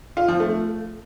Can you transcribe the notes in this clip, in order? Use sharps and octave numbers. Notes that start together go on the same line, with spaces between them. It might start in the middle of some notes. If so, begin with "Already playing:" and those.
F4
F3
A3